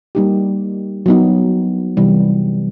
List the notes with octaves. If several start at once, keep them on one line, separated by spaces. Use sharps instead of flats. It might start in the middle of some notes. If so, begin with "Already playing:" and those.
G3 A#3 D#4 G4
F#3 B3 D#4
C3 E3 G3